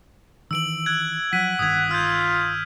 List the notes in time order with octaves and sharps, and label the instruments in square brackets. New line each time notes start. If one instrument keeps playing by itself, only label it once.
[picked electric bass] D#3 E3 [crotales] E6 D7 F#7
[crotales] F#6 G#6
[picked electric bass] F3 F#3 [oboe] F#5 [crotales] B6 D#7
[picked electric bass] G1 D#3 [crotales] D#6 G#6
[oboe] F4 [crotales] F6 G6